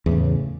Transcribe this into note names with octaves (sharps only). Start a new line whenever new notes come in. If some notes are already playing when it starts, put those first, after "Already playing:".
E2 A2 C#3